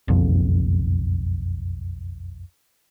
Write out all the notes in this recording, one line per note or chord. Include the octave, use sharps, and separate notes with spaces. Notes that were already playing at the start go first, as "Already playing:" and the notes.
F#1 B1 F2